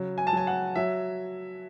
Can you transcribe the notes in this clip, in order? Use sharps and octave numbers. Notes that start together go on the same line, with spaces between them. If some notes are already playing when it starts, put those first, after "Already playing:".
Already playing: C#3 F#3
G#5
A5
F#3 G#5
F#5
F#3 E5